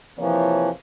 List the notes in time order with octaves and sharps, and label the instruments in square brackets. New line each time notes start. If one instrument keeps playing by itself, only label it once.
[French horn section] C3 A#3 C#5 [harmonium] E3 F3